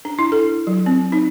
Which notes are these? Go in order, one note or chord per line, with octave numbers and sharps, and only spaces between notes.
D4
E4
A4
F#3
C4
D#4